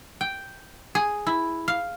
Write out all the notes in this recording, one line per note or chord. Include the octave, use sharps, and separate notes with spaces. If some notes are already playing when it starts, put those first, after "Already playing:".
G5
G#4
E4
F5